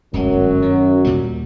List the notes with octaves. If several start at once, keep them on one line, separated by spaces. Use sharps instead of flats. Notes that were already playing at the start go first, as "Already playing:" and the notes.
D1 G1 F#2 F#3 G#3
D#3
D#2 A#2 G3